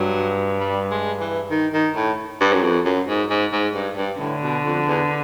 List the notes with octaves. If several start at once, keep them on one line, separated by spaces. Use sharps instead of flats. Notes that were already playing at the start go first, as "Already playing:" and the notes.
Already playing: G2 F#3
G3
G#3
E3
D#3
D#3
A2
G2
F#2
F2
F#2
G#2
G#2
G#2
G2
G2
A2 D3
B2
F2
E2